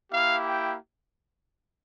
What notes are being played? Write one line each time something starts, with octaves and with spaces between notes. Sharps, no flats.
A#3 E4 G4 F5
G5